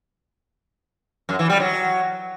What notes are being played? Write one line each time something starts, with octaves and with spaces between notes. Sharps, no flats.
F#2
E3
G3
F#3